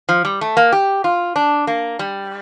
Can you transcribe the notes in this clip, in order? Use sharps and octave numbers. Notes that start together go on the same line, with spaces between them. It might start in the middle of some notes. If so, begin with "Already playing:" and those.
F3
G3
A3
A#3
G4
F4
D4
A#3
G3